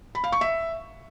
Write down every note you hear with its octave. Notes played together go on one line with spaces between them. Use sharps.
B5
F5
C#6
E5